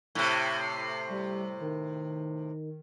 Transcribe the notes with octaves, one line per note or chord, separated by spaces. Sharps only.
A2 C3 G#6
C7
G3
D#3